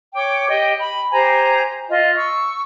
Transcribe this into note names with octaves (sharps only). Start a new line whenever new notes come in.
C#5 G5 D6
G4 D#5 G5
B5
G4 C5 G#5 A#5
F4 D#5
C#6 E6